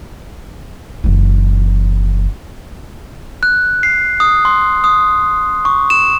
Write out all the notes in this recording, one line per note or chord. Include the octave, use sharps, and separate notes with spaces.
F#1 E3
F#6
C7
D#6
C6
D#6
C#6
E7